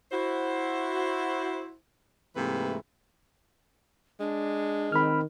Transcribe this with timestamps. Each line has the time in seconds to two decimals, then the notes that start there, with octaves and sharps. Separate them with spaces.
0.12 E4 F#4 C5
2.36 G#2 C3 E3 A3 A#3 B4
4.20 G#3 D4
4.92 D#3 C4 B5 F6